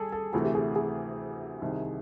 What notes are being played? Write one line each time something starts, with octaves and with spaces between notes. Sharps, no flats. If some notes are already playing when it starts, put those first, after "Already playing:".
Already playing: G3 G#4 A4
A4
D2 C3 E3 A3 G#4
G4
G#4
G#4
C2 C3 D#3